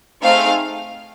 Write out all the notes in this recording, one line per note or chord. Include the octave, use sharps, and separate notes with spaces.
A3 C4 D#4 G#4 F5